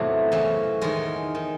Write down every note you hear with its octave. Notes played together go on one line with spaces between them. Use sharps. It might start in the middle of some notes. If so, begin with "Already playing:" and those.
Already playing: E2 A2 C3 E3 F#3 A3
F#2 C#3 E3
E2 D#3 G#3
D#3